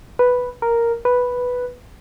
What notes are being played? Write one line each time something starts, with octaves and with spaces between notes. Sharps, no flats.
B4
A#4
B4